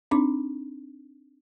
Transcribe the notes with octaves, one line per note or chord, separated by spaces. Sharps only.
C4 D4 D#4 D6